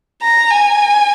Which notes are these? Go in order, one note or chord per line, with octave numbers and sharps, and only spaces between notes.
A#5
G#5